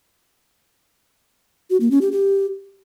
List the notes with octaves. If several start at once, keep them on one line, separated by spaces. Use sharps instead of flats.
F#4
A#3
C#4
G4
G4